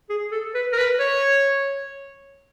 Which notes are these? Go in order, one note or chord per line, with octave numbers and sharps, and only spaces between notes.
G#4
A4
B4
A#4
B4
C#5